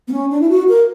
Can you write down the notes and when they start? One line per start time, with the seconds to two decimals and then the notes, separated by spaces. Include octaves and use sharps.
0.08 B3
0.12 C#4
0.30 D4
0.41 E4
0.50 F#4
0.69 A#4